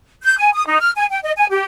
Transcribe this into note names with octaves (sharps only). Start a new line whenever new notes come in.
G6
G#5
D#6
D#4
F6
G#5
G5
D#5
G#5
G4